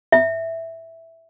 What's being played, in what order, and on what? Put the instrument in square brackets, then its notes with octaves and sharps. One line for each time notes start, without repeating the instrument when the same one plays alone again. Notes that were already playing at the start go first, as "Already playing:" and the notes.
[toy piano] E5